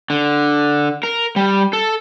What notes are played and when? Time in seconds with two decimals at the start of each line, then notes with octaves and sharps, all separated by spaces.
0.10 D3
1.03 A#4
1.36 G3
1.73 A4